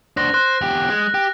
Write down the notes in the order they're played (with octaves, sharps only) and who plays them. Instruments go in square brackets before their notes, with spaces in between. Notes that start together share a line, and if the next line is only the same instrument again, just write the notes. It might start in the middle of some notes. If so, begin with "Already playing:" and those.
[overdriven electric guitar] D4 C5 [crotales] F#6 A#6
[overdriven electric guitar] C5 [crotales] F#6
[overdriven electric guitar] E2 G4
G#3
G4